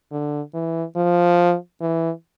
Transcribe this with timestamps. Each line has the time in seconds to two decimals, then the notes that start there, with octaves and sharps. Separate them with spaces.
0.12 D3
0.54 E3
0.96 F3
1.81 E3